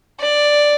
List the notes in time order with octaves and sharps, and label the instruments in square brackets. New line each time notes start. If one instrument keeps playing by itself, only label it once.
[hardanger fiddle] D5